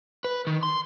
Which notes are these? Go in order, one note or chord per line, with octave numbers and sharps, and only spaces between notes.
B4
D#3
C6